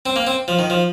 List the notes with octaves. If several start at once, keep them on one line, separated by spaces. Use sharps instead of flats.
C4
A#3
C4
F3
D#3
F3